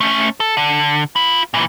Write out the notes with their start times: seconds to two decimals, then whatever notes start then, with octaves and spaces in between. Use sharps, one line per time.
0.01 A3 C#4
0.40 A4
0.57 D3
1.16 F4 B5
1.54 A#2 E3